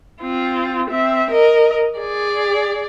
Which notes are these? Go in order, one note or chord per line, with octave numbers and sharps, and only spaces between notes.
C4 F4
C4 E5
A#4 D#5
G#4 D5